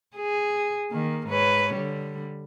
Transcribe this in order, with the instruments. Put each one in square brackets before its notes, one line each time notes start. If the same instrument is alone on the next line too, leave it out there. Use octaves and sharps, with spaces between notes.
[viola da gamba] G#4
D#3 A#3
G#2 B4 C#5
D3 G3